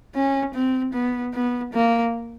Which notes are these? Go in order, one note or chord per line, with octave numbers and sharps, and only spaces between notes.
C#4
C4
B3
B3
A#3